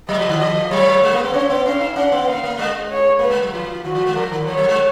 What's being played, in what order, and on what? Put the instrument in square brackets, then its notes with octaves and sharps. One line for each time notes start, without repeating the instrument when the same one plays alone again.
[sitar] F#3 [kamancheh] D#5
[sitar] F3
D#3
[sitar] F3 [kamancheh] D#5
[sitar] F#3 [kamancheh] C#5
[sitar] G#3
A#3
B3
[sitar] C#4 [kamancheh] C#5
[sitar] B3
[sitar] C#4 [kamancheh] F5
[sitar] D#4
[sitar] C#4 [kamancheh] F#5
[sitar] B3
[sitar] A#3 [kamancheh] F5
[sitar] A#3
[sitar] G#3 [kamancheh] D#5
[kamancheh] C#5
[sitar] A#3 [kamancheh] B4
[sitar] G#3
F#3
[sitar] F3 [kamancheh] F4
[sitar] D#3 [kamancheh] F#4
[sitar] F3
G#3
[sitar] F3 [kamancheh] A#4
[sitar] D#3
[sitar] F3 [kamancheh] C#5
[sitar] F#3
G#3